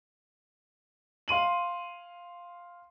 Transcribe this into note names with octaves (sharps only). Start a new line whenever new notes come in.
F5 C6 D#7 F#7